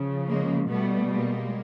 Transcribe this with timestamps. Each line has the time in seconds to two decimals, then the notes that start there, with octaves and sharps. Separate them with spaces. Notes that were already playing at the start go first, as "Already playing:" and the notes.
Already playing: C#3 F3
0.27 G#3 A#3
0.68 B2 G3 A3 B3
1.09 G#3 A#3